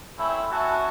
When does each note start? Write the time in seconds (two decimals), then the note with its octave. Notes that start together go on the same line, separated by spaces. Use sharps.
0.18 A3 C4 C#4 E4
0.51 C#4 F#4 E5 A5